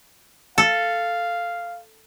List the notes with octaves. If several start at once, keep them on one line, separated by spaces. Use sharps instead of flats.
A4 F5